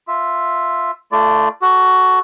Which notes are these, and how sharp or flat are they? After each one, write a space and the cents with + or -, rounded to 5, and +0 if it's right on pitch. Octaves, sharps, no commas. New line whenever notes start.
F4 +0 E5 +0
A3 +0 F4 -35 D5 +0
F#4 +10 A4 -10